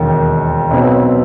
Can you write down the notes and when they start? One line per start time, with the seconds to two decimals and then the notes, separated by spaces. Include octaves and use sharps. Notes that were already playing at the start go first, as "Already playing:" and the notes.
Already playing: E1 D#2 D#3
0.71 B1 B2 F#3 C4